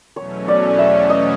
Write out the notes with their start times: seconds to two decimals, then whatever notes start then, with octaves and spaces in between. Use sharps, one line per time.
0.16 E2 B2 F#3 A3 C#4 C#5
0.48 D5
0.78 E5
1.10 D#5